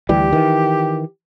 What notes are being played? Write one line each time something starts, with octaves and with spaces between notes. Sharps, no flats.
D2 E3 G3 G4
D#3 E3